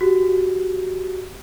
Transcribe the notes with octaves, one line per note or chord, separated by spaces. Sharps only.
F#4 G4